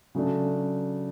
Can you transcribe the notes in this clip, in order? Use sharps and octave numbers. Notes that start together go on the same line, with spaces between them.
C#3 F#3 A3 D4